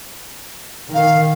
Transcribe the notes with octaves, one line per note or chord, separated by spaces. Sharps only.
D#3 F5